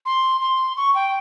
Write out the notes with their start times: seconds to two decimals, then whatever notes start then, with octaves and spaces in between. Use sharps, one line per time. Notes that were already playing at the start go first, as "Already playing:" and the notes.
0.06 C6
0.41 C6
0.77 C#6
0.95 G5